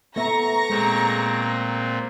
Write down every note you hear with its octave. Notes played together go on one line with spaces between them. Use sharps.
A3 B3 E5 A#5 C#6 A#6
A#2 G#3 C4